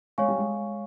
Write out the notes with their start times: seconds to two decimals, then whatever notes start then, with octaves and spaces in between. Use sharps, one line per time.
0.18 G#3 C#5 F5 G#5 C#6
0.28 G3
0.38 G#3